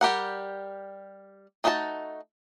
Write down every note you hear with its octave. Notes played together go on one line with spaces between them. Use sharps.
G3 G4 A#4 F#5
A3 D#4 F#4 B4 A5